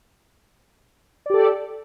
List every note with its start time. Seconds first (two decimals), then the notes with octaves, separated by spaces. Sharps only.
1.26 D5
1.30 G4
1.34 A4